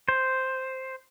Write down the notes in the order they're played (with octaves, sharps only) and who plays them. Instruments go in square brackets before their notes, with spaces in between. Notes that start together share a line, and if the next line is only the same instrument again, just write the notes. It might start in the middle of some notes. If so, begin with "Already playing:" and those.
[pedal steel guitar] C5